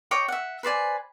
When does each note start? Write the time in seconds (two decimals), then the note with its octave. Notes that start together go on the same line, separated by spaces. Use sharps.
0.11 C#5 D#5 G5 D6
0.28 E5 F#5
0.63 B4 C5 D5 G#5